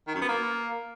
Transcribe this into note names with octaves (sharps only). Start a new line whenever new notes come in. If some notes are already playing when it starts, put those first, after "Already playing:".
D#3
F#2
B3
A#3